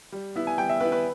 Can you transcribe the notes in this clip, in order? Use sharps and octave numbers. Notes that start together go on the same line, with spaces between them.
G3
B3 E4
G#5
G3 G5
E5
B3 E4 B4
B4